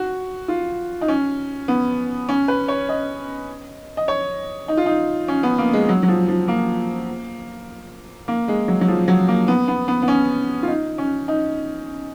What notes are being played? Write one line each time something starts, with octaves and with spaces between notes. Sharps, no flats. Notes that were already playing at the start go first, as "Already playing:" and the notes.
Already playing: F#4
F4
D#4
C#4
B3
C#4
B4
C#5
D#5
D#5
C#5
D#4
F4
D#4
C#4
B3
A#3
G#3
F#3
F#3
F3
F3
A#3
A#3
G#3
F#3
F#3
F3
F#3
A#3
B3
B3
B3
B3
C#4
F4
D#4
C#4
D#4